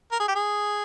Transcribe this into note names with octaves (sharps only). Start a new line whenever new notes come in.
A#4
G#4
G4
G#4